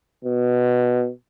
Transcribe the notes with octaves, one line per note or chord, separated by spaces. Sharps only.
B2